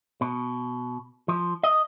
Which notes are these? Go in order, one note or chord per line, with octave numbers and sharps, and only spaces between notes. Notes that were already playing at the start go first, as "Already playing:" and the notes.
B2
F3
D#5